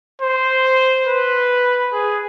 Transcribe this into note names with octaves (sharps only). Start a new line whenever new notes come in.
C5
B4
G#4